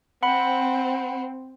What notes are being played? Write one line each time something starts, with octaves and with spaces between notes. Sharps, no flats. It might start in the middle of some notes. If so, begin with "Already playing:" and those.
C4 F#5 B5